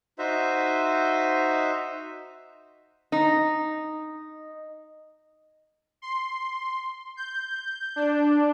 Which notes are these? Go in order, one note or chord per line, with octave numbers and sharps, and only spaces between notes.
D#4 F#4 C5 E5
D#4
C6
G6
D4